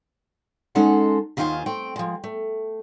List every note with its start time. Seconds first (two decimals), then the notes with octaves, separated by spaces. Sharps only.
0.75 G#3 C#4 D#4 A4 C5 F#5
1.37 D#2 D#3 F4 C5 F5 G#5
1.66 A3 C4 G5
1.96 F3 G#3
2.24 A3